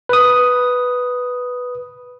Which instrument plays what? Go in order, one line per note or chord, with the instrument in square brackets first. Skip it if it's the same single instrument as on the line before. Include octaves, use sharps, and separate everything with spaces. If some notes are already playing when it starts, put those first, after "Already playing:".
[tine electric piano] B4 D#6